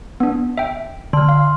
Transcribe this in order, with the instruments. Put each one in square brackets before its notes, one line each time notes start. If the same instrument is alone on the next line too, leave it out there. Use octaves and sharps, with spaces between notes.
[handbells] B3 D4
E5 G5
[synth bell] D3 [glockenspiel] C6 F6
[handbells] F5